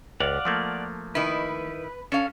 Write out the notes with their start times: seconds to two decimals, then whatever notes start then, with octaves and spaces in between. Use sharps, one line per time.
0.20 C#2 D5 F5 F#5
0.45 F3 A3 A#3
1.15 D#3 E4 B4
2.12 C#4 A4 F5